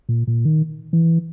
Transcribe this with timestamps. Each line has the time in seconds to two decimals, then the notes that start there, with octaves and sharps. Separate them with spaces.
0.09 A#2
0.27 A#2
0.45 D#3
0.93 E3